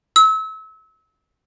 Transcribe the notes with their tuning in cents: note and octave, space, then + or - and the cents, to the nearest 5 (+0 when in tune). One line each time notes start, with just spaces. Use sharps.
E6 -30